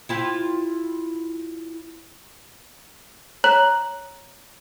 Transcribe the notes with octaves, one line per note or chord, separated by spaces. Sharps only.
E4 F4 G4
C#5 A#5 F#6 F#7